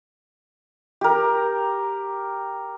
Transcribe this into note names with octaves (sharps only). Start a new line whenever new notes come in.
G4 A#4